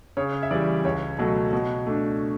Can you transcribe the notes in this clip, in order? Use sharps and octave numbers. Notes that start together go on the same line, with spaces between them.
C#3 C#5
E5
E3 G3 D5
C#2 C#5
B2 F#3 A3
B2
A3 D4